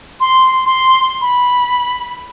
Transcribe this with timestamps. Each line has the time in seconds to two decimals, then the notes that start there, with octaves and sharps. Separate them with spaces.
0.20 C6
0.65 C6
1.21 B5